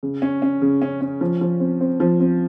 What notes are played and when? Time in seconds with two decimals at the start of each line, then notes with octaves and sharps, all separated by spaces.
0.03 C#3
0.22 C#4
0.42 C#4
0.62 C#3
0.82 C#4
1.01 C#4
1.21 F3
1.41 F3
1.60 C4
1.81 C4
2.00 F3
2.20 C4